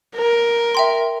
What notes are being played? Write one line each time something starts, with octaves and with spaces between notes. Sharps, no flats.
A#4
E5 G5 C6